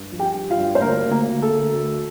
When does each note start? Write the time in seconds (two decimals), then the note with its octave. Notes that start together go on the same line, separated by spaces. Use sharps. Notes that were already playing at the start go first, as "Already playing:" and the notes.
Already playing: G2
0.12 F3
0.19 G4 G5
0.34 G2
0.50 F4 F5
0.58 G2
0.75 C5
0.81 D2 A#3 A#4
1.04 D2
1.11 A#3 A#4
1.27 D2
1.42 A4
1.50 D2
1.74 D2